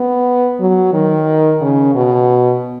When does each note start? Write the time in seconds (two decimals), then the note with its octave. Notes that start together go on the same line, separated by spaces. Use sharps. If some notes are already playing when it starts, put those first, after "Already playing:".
Already playing: B3
0.60 F#3
0.93 D#3
1.61 C#3
1.95 B2